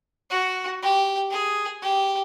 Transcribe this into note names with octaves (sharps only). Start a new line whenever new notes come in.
F#4
G4
G#4
G4